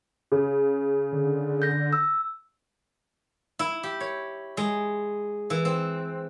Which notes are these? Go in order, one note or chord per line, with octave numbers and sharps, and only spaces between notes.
C#3
D3
G6 A#6
E6
E4
G4
C#5
G#3
E3
C4